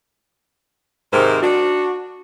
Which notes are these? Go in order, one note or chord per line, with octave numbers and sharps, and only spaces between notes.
G#2 C3 D#3 A#4 C5
D4 F#4